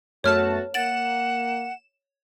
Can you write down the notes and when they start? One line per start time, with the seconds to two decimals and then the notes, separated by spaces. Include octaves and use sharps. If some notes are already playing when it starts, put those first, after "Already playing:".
0.24 F#2 A3 B3 F#4 C#5 A5 F6
0.74 A#3 F#5 A6 D7 E7 F#7